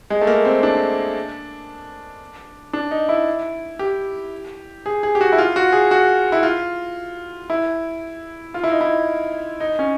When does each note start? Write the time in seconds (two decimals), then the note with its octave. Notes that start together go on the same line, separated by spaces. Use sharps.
0.10 G#3
0.21 A3
0.27 A#3
0.45 C4
0.63 D4
2.73 D4
2.91 D#4
3.09 E4
3.79 G4
4.86 G#4
5.03 G#4
5.15 G4
5.21 F#4
5.32 E4
5.38 F4
5.56 F#4
5.72 G#4
5.91 F#4
6.32 E4
6.43 F4
7.50 E4
8.54 F4
8.64 E4
8.71 D#4
8.81 E4
9.60 D#4
9.79 C#4